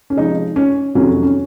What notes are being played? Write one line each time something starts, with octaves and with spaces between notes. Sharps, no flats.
C#4
C3 F3 G#3 D#4
C#4
F2 C3 D#3 F#3 C#4
C#4